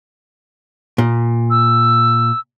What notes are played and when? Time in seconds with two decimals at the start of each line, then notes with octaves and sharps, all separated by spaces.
0.98 A#2
1.50 E6